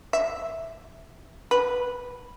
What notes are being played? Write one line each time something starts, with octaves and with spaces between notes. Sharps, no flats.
E5
B4